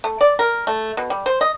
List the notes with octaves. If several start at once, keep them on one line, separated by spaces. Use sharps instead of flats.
A3
D5
A#4
A3
B2
G3
C5
D#5